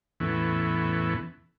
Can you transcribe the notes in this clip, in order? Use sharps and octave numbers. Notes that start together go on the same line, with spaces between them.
E2 A2 E3 B3 C#4